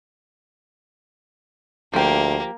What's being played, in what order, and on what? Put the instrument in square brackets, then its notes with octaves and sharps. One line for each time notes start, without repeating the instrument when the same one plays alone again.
[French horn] D2 [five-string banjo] F3 G4 [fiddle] A#3